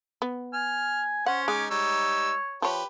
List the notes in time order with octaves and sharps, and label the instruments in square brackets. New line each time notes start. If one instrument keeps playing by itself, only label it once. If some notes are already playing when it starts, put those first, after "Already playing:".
[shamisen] B3
[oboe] G#5 [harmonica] F6
[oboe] C#4 [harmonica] C5 [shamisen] F#5
[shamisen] G#3 [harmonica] D#4 G#5 D6
[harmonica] G3 D#4 E6 [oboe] C#5
[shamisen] F3 C#5 [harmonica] G4 B4